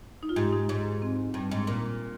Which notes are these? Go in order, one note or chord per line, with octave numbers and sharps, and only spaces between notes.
D#4
F4
G#2 G4
D#4
G#2
C4
G2
G#2
A#2 A#3